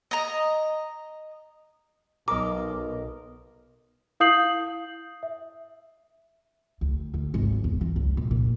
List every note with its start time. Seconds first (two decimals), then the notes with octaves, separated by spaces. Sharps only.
0.11 D#5 A#5
2.28 B1 A#4 D#5 D6
4.20 E4 F5 D#6 G6 C7 F#7
5.23 E5
6.81 D2
7.14 D2
7.34 G#1
7.64 E2
7.81 E3
7.96 C#2
8.17 A#1
8.31 A#2